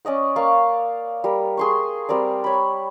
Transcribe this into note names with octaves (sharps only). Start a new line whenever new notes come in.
C#4 D5 D#5 F#5
A#3 D5 F5 C#6
G3 A#4
G#4 C6 C#6
G3 C4 A#4 D5
C#5 B5